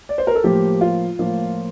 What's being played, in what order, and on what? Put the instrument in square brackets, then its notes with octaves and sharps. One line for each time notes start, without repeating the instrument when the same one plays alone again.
[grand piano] D5
C5
A#4
A4
A2 F3 A#3 G4
F4
A2 F3 A#3